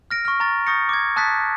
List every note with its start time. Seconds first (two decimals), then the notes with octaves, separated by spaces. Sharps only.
0.11 F6 A#6 D7
0.25 C#6 F6
0.40 A#5 C#6 A6
0.66 C#6 D#6 G6 A6 A#6 C#7
0.89 D6 G#6
1.16 A5 D#6 F#6 A6 B6